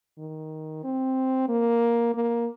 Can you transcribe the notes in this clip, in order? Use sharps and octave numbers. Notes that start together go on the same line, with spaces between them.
D#3
C4
A#3
A#3